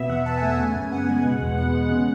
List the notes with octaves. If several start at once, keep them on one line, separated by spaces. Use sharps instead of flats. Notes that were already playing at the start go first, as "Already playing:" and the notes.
Already playing: B2 B3 E5
E2 F#5
E2 A5
A3 G#5
F#5
C#3 G#5
F#2
B3 F#5
G#3
B2
E2
B3 F#5
G#3
C#3